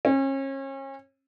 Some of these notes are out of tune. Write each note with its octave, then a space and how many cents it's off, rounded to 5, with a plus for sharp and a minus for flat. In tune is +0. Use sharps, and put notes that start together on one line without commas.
C#4 -35